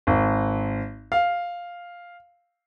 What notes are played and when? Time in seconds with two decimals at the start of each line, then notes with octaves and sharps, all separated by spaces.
0.07 G#1
1.12 F5